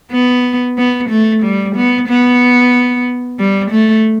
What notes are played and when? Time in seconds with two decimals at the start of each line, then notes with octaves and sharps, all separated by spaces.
0.11 B3
0.77 B3
1.09 A3
1.43 G3
1.75 B3
2.08 B3
3.39 G3
3.71 A3